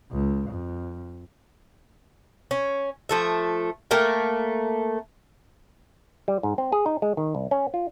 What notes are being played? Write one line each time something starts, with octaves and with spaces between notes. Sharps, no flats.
C#2
F2
C#4
F3 A3 E5
A3 A#3 A#4 G5
G3
G#2
C4
G#4
D#4
G#3
D#3
C2
C#4
F4